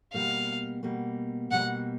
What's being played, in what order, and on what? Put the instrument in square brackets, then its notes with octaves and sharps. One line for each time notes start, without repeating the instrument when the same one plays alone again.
[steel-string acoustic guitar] B2 G3 A#3 [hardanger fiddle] F5
[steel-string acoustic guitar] B2 G3 A#3
[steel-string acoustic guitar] B2 G3 A#3 [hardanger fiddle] F#5